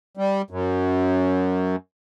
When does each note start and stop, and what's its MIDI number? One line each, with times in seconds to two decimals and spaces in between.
0.17 0.42 55
0.50 1.76 42